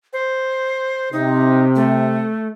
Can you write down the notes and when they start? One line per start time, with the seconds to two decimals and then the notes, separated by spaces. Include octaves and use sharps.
0.13 C5
1.13 C3 D#4
1.76 A3